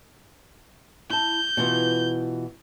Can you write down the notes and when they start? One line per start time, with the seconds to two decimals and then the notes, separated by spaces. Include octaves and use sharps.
1.10 E4 A5 G6
1.57 B2 E3 F4